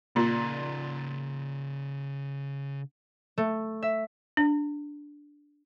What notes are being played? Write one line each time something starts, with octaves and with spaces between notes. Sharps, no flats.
A#2 C#3 D5
A3
E5
D4